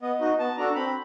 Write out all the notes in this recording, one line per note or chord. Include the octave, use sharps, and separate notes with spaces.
B3 D#5
D#4 F#4
B3 A5
D4 F#4 A4 A#5
C4 B5